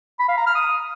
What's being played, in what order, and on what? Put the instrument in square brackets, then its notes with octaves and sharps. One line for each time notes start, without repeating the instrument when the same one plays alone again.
[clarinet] B5
F5
A#5
F6
D#6